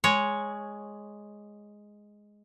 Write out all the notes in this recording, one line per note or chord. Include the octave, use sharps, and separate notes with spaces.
G#3 C#5